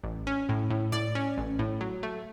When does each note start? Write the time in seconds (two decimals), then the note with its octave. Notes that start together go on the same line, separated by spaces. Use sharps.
0.04 A1
0.27 C#4
0.49 A2
0.70 A2
0.92 A2 D5
1.15 C#4
1.38 A1
1.59 A2
1.81 F#3
2.03 A3